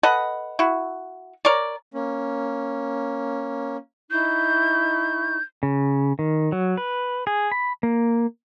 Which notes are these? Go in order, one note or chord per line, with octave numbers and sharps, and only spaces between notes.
A4 B4 D#5 F#5
E4 F#4
A#4 C#5 D5
A#3 C#4
D#4 E4 C#6 G6
C#3
D#3
F#3
B4
G#4
B5
A#3